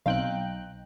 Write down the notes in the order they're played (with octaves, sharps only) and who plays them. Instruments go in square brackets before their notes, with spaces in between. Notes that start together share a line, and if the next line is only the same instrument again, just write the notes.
[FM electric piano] B1 G5 F#6 [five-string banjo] C4 D#4 F5